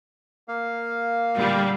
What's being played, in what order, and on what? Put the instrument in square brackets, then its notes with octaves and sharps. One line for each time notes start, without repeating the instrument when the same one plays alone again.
[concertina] A#3 F5
[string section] A#2 D3 G3